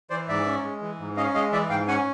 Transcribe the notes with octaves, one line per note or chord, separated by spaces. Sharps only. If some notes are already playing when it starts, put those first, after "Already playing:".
E3 C5 D5
G#2 D5 E5
C#4
G#3
E3
G#2
C#4 D#5 F5
G#3 D#5 F5
E3 D5 E5
G#2 F5 G5
C#4 F#5 G#5